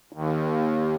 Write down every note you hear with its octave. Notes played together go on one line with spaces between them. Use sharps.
D#2